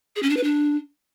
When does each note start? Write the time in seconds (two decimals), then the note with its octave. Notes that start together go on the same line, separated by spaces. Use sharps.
0.16 G#4
0.23 C#4
0.30 D4
0.37 B4
0.44 D4